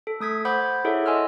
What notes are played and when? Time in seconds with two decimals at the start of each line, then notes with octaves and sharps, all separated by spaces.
0.07 A4
0.20 A3 D#6 G#6 B6
0.45 C5 F#5 B5 D6 G6 G#6
0.84 E4 G#4 A4 C#5 E5 F#5
1.06 D#5 G#5 C6 E6 F6